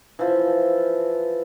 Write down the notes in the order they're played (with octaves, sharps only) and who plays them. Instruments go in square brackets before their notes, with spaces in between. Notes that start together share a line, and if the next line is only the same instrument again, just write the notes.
[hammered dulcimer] E3 F3